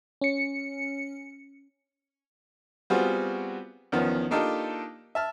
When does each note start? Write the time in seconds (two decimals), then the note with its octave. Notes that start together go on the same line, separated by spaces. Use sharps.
0.21 C#4 C#7
2.90 G3 B3 C4 F4 F#4 G#4
3.92 E2 D#3 F3 B3 C#4
4.31 A#3 D4 D#4 F4 G4 A4
5.15 E5 A5 F6